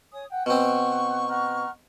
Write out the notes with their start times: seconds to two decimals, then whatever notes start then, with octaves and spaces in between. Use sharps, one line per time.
0.12 C#5 G#5 D#6
0.30 F#5 G5
0.46 B2 C4 F#5 C#6
1.29 F#5 A#5 F6